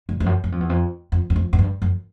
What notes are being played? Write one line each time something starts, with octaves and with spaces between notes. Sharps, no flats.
G2
F2
F#2
F#2
F2
E2
F2
F2
F#2
F2
F#2
G2
F#2